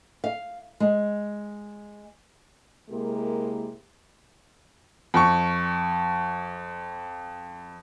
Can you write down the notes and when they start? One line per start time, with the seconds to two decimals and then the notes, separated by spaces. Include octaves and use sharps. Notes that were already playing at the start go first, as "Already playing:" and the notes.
0.24 F5
0.80 G#3
2.90 C3 G#3 A#3 E4 G4 A#4
5.14 F2 C#6